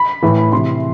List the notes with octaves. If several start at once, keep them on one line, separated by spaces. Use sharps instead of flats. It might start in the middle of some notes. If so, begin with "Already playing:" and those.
Already playing: B5
A2 E3
C3 E3 C6